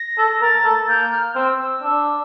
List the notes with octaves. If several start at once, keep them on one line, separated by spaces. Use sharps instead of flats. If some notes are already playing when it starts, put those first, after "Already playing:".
Already playing: A#6
A4
A#4 A6
A4
A#3 G6
F6
C4 E6
E6
D4